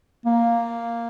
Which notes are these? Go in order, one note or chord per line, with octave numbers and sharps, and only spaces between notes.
A#3